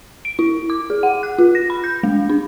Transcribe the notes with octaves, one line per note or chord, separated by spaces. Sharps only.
D7
E4
D6
G#4
F#5
F#6
F4
A#6
B5
G6
G#3
D4